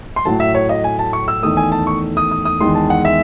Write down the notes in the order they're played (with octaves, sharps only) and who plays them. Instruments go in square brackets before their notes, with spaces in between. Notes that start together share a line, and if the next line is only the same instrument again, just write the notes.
[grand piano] C6
A2 F#3 A3 A5
E5
C#5
D#5
G#5
A5
C#6
E6
E2 D#3 A3 D#6
G#5
A5
C#6
D#6
D#6
D#6
E2 D#3 G#3 C6
A5
F#5
E5